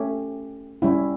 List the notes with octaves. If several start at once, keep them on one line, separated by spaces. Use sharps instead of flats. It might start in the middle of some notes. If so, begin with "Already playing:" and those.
Already playing: A3 C#4 G4
G3 C#4 E4